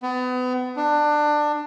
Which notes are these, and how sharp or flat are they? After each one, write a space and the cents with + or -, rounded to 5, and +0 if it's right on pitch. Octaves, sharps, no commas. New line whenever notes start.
B3 +35
D4 +20